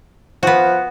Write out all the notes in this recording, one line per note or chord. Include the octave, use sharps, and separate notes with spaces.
F3 B3 F#4